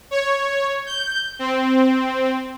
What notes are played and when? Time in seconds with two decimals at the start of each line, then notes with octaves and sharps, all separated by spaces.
0.11 C#5
0.86 G6
1.39 C4